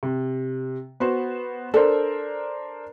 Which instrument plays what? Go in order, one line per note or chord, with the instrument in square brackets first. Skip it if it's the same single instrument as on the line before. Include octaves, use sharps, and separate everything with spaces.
[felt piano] C3
B3 F#4 C5
[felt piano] D4 A#4 C5 [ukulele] A4